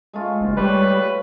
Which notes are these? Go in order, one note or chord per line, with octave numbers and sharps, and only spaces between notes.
G#3 A3 F4
F#1
G3 B4 C#5